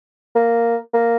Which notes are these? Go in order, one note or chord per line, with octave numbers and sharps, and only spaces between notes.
A#3
A#3